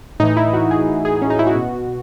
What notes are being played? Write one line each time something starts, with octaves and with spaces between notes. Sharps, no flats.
A2 E3 D#4
E4
F#4
G#4
G#4
C#4
D#4
E4
F#4
B2